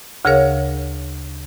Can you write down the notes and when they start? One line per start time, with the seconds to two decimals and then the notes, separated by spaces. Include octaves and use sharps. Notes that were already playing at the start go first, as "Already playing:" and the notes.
0.25 D2 C#3 G#4 A#4 C#5 F5